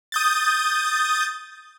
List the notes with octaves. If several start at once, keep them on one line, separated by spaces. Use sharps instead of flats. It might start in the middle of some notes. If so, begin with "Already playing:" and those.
D#6 G6 A6